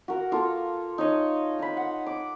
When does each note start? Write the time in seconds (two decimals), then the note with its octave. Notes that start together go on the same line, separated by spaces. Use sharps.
0.08 F#4 A#4 F#5
0.32 A#3 F4 A4
0.98 D#4 C#5 D#5
1.59 D#4 B5
1.77 F#5
2.06 D6